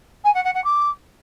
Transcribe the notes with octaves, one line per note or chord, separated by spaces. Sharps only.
G#5
F#5
F#5
F#5
D6